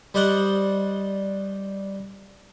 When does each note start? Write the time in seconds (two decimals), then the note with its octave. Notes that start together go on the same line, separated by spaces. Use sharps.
0.14 G3 C5 D5 D#5 F#5